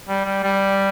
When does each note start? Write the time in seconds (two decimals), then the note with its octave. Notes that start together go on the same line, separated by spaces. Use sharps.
0.09 G3
0.25 G3
0.44 G3